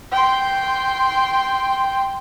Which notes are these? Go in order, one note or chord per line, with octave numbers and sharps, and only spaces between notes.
G5 C6